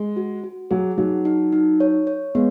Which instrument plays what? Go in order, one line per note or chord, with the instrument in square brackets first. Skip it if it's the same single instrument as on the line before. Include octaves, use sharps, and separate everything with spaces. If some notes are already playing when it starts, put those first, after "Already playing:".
Already playing: [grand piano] G#3
[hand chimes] F#4
F#4
[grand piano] F#3 [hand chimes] G#4
[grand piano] F#3 [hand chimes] D#4
[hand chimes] D#4
D#4
C#5
C#5
[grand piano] G#3 [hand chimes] B3